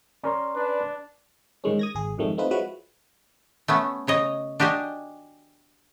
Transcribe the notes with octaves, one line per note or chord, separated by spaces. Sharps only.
C#4 A#4 D5 C6
D4 B4
G#2 D#3 G#3 C#4
D#6 G#6 A#6
G#1 G#4
F2 G#2 D#3 G3 A3
A3 C4 D#4 F4 B4
F3 F#3 G#3 E4 F#4 B4
A3 B3 C#4
C#3 C#5 D#5
D4 F#4 G4 D#5 G#5